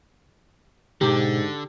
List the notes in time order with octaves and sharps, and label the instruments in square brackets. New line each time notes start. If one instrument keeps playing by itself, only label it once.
[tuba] G#2 [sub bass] B2 [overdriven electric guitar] D3 [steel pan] G4